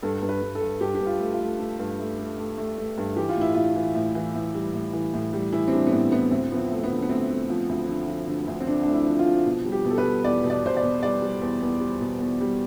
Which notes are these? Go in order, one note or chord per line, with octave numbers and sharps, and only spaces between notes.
G2 A4
G2
B4
G2
A4
G2
G2 G4
G4
G2
F4
A3
F4
A3
A3
G2
A3
A3
A3
A3
A3
G2
E3 G4
F4
A2
E4
A2 F4
E3
A2
E3
A2
G3
A2
E3
A2
G3
E3 E4
C4
G3 D4
B3
A2 C4
A2 B3
D2 C4
F3 B3
C4
A3
B3
D3
B3
A3 C4
A3
F3
D2
D3
F3
D3
D2
C4
D3 D4
A3 D4
E4
F3
F4
F3
B2
G3
G4
B2
A4
B4
G3
E2 D5
B2
D5
B2 C5
D5
B2
G3 D5
G3
E2
E2
G3
B2
E2
G3